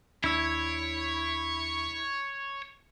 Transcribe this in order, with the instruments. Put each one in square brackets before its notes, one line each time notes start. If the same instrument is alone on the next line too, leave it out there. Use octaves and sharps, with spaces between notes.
[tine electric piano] D#2 D4 E6 [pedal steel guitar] E4 [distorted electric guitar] C#5